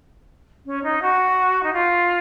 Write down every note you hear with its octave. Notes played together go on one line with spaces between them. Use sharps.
C#4
D#4
F#4
D#4
F4